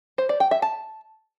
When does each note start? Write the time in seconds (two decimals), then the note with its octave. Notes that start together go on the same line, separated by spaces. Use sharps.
0.18 C5
0.29 D5
0.40 G5
0.51 E5
0.62 A5